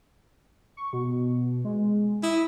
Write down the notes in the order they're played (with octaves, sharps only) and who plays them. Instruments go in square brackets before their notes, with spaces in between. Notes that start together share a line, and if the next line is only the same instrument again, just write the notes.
[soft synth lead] C#6
B2
G#3
[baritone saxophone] E4 [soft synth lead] D#6